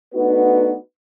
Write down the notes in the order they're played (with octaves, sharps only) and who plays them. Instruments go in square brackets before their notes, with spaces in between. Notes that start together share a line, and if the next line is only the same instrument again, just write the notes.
[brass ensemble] A3 B3 D4 D#4 F#4 B4